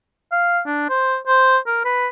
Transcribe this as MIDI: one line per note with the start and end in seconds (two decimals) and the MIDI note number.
0.32 0.60 77
0.66 0.88 62
0.89 1.17 72
1.27 1.57 72
1.67 1.85 70
1.85 2.07 71